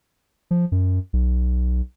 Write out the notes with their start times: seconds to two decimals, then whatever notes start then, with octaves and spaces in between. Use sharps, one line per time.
0.51 F3
0.72 F#2
1.13 B1